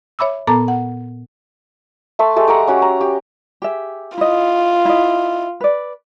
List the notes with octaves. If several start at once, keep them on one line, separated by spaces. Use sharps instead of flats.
C#5 E5 B5 D6 E6
A#2 B3 A4 A5 A#5 D6
F#5
A3 E5 A5 C6
G#3 A3 G4
D5 F#5 A#5 C#6
C#4 F#4 G4
A#5
G4
G4 G#4 E5
E4 F4 D#5
E4 D#5
B4 D5